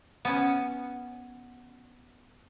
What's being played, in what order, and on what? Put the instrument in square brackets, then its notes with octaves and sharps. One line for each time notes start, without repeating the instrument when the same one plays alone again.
[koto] B3 C#4 [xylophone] F#5